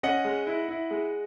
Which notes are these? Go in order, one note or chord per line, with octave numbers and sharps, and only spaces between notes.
C#4 D#5 F#5
G#3
E4
E4
G#3